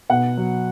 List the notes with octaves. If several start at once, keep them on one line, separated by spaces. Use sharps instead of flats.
B2 F#5
F#3